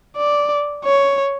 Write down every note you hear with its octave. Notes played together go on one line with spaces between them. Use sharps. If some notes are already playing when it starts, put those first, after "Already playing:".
D5
C#5